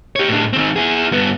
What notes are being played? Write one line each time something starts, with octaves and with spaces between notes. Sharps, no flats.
G4 C#5
A2 D4
D#3 C4
E4 G#4
G2 B3